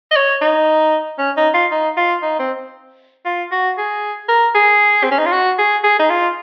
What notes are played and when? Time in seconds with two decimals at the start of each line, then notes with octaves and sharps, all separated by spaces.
0.11 D#5
0.16 C#5
0.41 D#4
1.18 C#4
1.37 D#4
1.54 F4
1.71 D#4
1.97 F4
2.22 D#4
2.39 C4
3.25 F4
3.52 F#4
3.78 G#4
4.28 A#4
4.55 G#4
5.03 C4
5.11 C#4
5.18 D#4
5.25 F4
5.33 F#4
5.58 G#4
5.84 G#4
5.99 D#4
6.10 F4